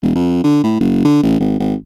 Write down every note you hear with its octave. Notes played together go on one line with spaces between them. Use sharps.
E1
F2
D3
A2
F#1
D3
A1
G#1
G#1